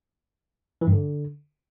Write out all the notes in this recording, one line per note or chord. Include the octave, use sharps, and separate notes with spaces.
E3
G2
D3